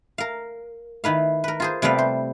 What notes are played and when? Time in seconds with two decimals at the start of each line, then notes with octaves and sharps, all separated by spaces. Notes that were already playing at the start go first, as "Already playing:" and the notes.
0.18 A#4 F5
1.04 D#3 E4 B4 F5
1.44 A#4 B4
1.60 F4 G#4 C5
1.82 C3 G3 A3 B3 B4 F5
1.99 C5